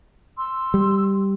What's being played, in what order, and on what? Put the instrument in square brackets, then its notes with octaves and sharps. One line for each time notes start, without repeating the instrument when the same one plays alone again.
[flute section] C6 E6
[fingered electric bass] G3